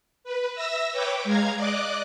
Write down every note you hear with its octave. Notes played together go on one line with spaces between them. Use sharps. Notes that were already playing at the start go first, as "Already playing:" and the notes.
B4
E5 E6 A#6
B4 C#5 G5 D6
G#3 F5 A#5 G#6
D5 D#5 D6 F#6